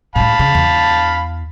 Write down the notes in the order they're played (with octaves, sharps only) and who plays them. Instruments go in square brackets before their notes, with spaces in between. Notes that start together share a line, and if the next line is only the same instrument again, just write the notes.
[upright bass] A2 G#3 [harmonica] F5 A5 B5
[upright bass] C#3
E2